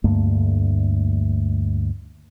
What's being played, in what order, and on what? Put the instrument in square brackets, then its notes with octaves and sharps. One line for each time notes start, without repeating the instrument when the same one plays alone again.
[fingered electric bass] D2 G2 A3 A#3